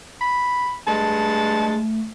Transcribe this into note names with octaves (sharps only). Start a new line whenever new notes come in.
B5
G2 G#3 A3 A5